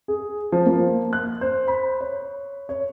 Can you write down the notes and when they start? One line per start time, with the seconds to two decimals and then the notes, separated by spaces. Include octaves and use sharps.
0.08 G#4
0.52 F3
0.66 A#3
1.13 F#6
1.41 C5
1.68 B5
2.01 C#5
2.69 C#5